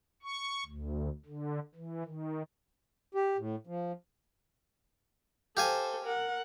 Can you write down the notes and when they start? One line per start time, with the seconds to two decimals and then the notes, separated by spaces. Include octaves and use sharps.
0.23 C#6
0.66 D2
1.26 D3
1.75 E3
2.04 D#3
3.15 G4
3.38 A2
3.67 F3
5.57 G4 A4 C5 F5 G#5
6.04 A#4 F#5